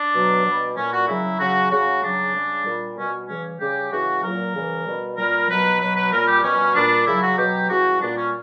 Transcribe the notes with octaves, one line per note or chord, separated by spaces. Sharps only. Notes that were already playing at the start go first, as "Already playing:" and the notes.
Already playing: D4
B2 F#3
B2 G3
A#2 G3 C#4
F#4
C#3 F#3 E4
C#3 F#3 F#4
C#3 G3 F#4
C#3 F#3 D4
C#3 G3
A#2 G3
B2 G3 C#4
C#3 E3 G3 C#4
C#3 G3 G4
C#3 E3 G3 F#4
A#2 F#3 A#4
C#3 E3 G3
B2 G3
A#2 G3 A#4
B2 F#3 B4
B2 F#3 B4
B4
A#2 G3 A#4
G4
B2 G3 C#4
A#2 G3 D4
C#3 F#3 E4
F#4
B2 F#3 G4
C#3 E3 G3 F#4
A#2 G3 D4
C#4